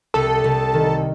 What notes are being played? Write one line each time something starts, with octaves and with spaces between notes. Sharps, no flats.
C2 A4
C2
D#3